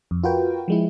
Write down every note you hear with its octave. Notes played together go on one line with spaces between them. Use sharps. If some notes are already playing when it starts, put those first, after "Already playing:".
F2
F4 F#4 A#4 B4 G5
F3 G#3 E4